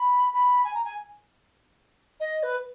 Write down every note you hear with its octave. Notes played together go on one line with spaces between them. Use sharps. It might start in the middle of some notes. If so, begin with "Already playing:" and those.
Already playing: B5
B5
G#5
A#5
G#5
D#5
B4